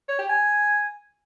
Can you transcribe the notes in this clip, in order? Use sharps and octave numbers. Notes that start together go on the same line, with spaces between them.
C#5
G4
G#5